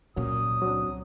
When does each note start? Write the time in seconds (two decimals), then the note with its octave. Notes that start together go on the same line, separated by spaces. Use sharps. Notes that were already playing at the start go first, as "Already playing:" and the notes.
0.16 C#2 A#2 F#3 A#3 C#4 D#6
0.62 F#3 C4 D4